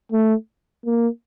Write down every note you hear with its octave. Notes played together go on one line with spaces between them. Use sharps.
A3
A#3